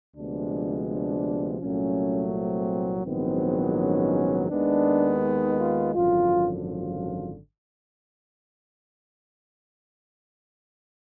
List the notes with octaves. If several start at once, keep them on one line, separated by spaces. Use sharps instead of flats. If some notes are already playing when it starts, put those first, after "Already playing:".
D2 C3 F3 G#3 B3 D4
D4
C2 A#2 F#3 A3 C#4
C4
A#1 G#2 D#3 F#3 B3 C4
C#4
D#2 D#3 G#3 B3 D4
D#4
F4
G#1 F#2 D3 F3 F4
F4